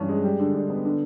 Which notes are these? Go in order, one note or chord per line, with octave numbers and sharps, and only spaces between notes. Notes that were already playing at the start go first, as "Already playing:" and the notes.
Already playing: G2 E3 C#4
G#3
G3
D3
D3
B3
D3